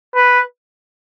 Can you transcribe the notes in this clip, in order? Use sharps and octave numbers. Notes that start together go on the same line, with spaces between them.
B4